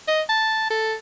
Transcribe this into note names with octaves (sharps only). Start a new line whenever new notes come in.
D#5
A5
A4